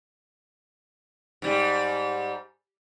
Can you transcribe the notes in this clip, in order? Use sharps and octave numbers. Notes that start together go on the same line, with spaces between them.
G#2 G3